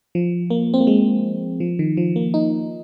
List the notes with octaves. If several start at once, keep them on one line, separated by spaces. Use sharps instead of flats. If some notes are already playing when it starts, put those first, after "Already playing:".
F3
A#3
C4
A#3
G#3
F3
D#3
F3
A#3
D#4